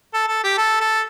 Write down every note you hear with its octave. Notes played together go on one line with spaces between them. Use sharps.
A4
A4
G4
A4
A4